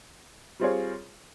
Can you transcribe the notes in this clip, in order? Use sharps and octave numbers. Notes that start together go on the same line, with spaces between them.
G3 C4 F4 G#4 C#5